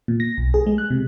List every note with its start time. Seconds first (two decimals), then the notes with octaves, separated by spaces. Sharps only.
0.08 A#2
0.20 A#6
0.37 B1
0.54 G#4
0.67 G#3
0.78 F#6
0.91 C3